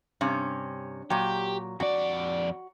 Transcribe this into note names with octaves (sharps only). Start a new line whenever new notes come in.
G2 C3 C#4
A#2 F#3 G4
F2 F#4 D5